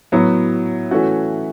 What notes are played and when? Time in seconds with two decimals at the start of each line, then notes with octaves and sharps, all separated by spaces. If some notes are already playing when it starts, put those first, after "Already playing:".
0.12 A2 F#3 B3
0.91 E3 A3 C#4 F#4